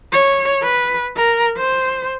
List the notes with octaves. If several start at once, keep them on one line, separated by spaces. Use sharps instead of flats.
C#5
B4
A#4
C5